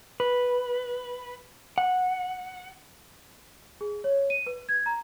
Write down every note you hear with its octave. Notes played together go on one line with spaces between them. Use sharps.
B4
F#5
G#4
C#5
D#7
B4
G#6
A#5